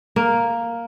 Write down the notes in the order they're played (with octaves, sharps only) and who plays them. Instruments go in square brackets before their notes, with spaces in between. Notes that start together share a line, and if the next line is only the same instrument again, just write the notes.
[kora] A#3